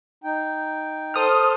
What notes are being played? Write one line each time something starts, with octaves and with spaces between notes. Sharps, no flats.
D#4 G5
A4 C5 D#6 F6